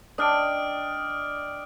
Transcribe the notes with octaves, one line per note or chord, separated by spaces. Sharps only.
D4 D#5 G5 D#6 F6 D7